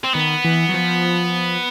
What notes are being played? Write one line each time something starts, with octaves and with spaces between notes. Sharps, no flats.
C4
D#3 B3
E3
F#3
F3